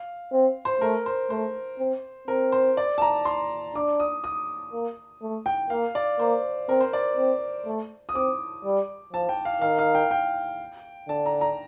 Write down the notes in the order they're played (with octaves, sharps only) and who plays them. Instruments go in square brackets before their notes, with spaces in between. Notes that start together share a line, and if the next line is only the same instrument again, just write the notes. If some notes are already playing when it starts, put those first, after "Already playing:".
Already playing: [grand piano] F5
[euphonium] C4
[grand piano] C5
[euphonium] A3 [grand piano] A#4
[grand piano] C5
[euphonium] A3 [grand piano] C5
[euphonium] C4
[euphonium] C4 [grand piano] A#4
[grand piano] C5
D5
A5
A#5
C6
[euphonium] D4 [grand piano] D6
[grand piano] D#6
D#6
[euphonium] A#3
A3
[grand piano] G5
[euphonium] A#3 [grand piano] F5
[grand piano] D5
[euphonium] A#3 [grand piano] C5
[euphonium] C4 [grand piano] A#4
[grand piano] C5
D5
[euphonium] C4
A3
[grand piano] D#6
[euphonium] C4 [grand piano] D6
[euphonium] G3
[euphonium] F3 [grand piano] A5
[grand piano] G5
F5
[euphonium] D#3 [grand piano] F5
[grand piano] F5
G5
G5
[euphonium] D3 [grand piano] A5
[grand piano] A#5
A#5